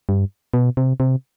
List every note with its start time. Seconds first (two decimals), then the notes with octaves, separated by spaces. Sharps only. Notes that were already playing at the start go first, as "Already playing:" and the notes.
0.09 G2
0.54 B2
0.77 C3
1.00 C3